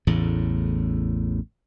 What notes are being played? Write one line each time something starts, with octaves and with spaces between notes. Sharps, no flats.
A1 E2 A2 C#3